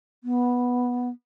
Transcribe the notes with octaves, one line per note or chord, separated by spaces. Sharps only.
B3